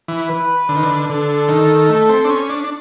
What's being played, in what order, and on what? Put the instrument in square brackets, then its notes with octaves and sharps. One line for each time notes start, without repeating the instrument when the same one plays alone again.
[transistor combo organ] E3
[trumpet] B4
[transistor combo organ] D3
D#3
D3
[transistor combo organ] D3 [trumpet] A4
[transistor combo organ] D#3
A3
C4
D4
C#4
D4
D4